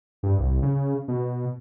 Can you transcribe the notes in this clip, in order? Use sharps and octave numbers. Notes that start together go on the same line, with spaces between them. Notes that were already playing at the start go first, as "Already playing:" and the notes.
G2
C2
C#3
B2